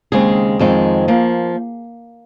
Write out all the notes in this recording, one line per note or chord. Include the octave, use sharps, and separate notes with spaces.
D#2 C#3 G#3 C4 G#4
F2 D#3 G#3 C4
F3 A#3